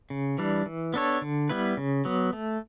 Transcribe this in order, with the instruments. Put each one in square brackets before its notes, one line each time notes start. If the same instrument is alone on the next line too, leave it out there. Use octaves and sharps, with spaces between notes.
[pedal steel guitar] C#3
E3 G3 D4
E3
B3 D4 A4 C#5
D3
G3 B3 E4 B4
C#3
F#3 B3
A3